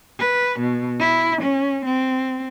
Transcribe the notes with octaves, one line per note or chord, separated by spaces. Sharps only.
B4
B2
E4
C#4
C4